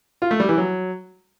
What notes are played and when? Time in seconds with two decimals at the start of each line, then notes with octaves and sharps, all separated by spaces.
0.22 F4
0.31 A3
0.40 G3
0.49 E3
0.58 F#3